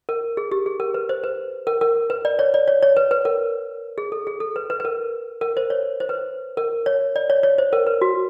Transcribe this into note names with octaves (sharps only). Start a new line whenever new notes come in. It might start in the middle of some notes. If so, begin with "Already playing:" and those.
A#4
G#4
G4
G#4
A#4
B4
C5
B4
A#4
A#4
B4
D5
C#5
D5
C#5
C#5
B4
B4
A#4
G#4
A4
G#4
A4
B4
B4
B4
A#4
A#4
C5
C#5
C5
B4
A#4
C#5
D5
C#5
C#5
C5
A#4
B4
F#4